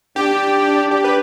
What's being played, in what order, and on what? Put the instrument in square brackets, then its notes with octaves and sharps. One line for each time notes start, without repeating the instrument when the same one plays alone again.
[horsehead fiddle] D4 [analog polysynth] G4
[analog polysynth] G4
B4